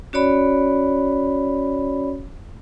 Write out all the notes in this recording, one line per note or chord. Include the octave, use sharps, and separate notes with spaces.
C#4 F#4 C#5 D5 B5